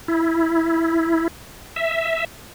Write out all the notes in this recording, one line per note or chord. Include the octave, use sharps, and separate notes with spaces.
E4
E5